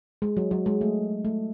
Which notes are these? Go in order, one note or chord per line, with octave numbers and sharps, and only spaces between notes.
G#3
F#3
F#3
G#3
A3
A3